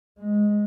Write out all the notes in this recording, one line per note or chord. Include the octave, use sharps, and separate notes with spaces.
G#3